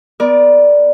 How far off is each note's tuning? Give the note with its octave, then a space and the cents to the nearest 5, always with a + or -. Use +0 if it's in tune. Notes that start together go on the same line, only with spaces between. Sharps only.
B3 +15 A#4 +35 D5 +0